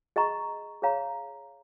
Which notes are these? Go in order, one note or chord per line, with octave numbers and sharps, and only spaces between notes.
G#4 D#5 A#5 C#6
G#4 C#5 F5 A#5